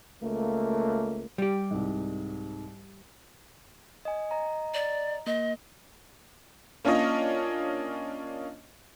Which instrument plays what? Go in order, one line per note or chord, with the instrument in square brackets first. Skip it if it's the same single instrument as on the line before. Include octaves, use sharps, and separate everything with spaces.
[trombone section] C#2 A3 A#3
[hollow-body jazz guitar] G3 G4
[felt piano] C2 G#2
[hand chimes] D#5 G#5
D#5 A#5
[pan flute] D5
[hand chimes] A#3 [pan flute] D#5
[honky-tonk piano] A#3 C#4 D4 F4 C#5 D#5